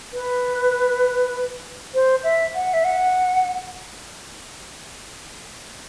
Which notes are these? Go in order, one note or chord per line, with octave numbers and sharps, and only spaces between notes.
B4
C5
E5
F#5
E5
F#5